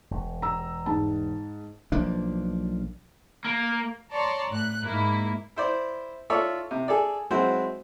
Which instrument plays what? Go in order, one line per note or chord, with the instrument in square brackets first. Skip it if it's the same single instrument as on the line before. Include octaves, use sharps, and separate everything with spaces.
[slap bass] E1
[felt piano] A#5 E6
G#2 A5
[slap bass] B1 F3 A#3 D4
[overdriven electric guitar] A#3
[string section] C#5 D5 A5 A#5 C6
A2 F#6
G#2 A#3 E4
[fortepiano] E4 C5 D5
F4 A4 C#5 D5 E5
C3
G#4 A4 D5
F#3 G#3 C4 E4 F#4 C5